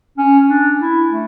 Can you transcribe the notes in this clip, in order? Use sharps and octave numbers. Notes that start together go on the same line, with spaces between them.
C#4
D4
E4
A3